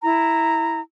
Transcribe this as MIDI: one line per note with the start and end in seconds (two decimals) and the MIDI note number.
0.02 0.79 64
0.02 0.79 82